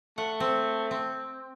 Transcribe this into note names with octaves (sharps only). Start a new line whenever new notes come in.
A3 F#5
C4
C4